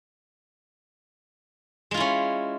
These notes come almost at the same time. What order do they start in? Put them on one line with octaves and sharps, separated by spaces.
G#3 F4 E4 C#4